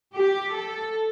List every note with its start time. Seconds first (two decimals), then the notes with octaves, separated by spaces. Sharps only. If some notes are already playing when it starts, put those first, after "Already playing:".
0.16 G4
0.55 A4